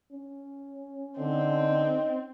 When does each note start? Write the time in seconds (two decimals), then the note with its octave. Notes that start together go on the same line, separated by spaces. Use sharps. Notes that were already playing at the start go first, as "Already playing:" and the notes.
0.12 C#4
1.19 D3 C4 D#4 D#5